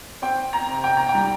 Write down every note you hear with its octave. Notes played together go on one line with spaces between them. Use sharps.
C4 G5
A#5
C3
G5
A#5
G5
G3